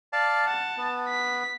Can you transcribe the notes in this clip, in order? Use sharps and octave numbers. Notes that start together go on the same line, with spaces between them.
D5 F5 A5
F#5 A5
B3
B6